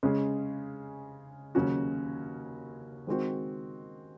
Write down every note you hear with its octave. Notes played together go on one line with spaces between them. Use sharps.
C#3 G#3 C#4 G#4
D#2 C#3 F#3 C#4 F#4
D#3 G#3 C4 F#4